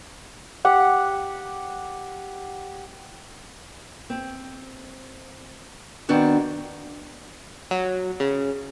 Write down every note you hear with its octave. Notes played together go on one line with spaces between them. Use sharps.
G4 F#5
C4
D#3 B3 C4 D4 F#4
F#3
C#3